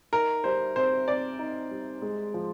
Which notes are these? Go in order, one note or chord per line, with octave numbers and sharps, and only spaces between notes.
D#4 A#4
G3 C5
C4 C5
C4 D5
D#4
G3
G#3
F3